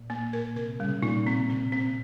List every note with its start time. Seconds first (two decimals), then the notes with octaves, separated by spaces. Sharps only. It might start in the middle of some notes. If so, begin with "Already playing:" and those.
Already playing: A#2
0.10 A#3
0.33 A#4
0.56 C3 A#4
0.80 C#3 G3
1.02 A#2 D#4
1.27 C4
1.50 C4
1.72 C4